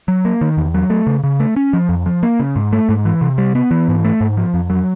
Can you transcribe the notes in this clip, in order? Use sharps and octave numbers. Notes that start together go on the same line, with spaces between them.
F#3
A#3
D#3
E2
F#3
A3
C#3
C#3
A3
C#4
F3
F2
F3
A#3
C#3
G#2
A3
G#2
E3
C3
G3
B3
E3
G#2
A3
G#2
F3
F2
F#3